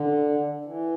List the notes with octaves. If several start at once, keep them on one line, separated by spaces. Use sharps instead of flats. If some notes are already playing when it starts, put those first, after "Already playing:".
Already playing: D3
E3